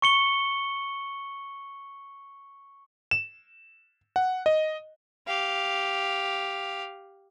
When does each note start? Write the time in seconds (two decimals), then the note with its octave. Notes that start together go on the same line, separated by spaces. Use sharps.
0.02 C#6 C#7 G7
3.11 E7
4.16 F#5
4.46 D#5
5.28 G4 F5